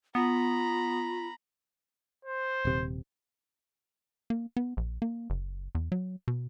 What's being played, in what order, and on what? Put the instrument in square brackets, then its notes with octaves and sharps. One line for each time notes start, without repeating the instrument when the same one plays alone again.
[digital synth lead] B3 [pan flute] F4 [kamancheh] A#5 B5
[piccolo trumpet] C5
[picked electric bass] D#1 C3
[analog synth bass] A#3
B3
A#1
A#3
F#1
E2
F#3
B2